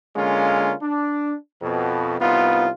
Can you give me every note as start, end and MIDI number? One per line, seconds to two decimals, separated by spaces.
0.16 0.73 50
0.16 0.73 56
0.16 0.73 58
0.16 0.73 61
0.16 0.73 65
0.82 1.33 62
1.62 2.19 41
1.62 2.19 47
2.21 2.68 36
2.21 2.68 59
2.21 2.68 63
2.21 2.68 65